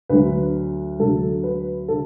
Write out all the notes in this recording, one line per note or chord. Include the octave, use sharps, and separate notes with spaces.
D2 D3 F#3 B4
D2 D3 F#3 A4
B4
D3 A4